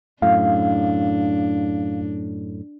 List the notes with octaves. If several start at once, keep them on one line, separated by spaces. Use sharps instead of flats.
F#2 A2 D4 F5